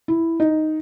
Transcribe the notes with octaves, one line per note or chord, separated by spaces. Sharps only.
E4
D#4